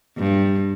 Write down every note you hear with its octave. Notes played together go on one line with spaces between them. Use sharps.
G2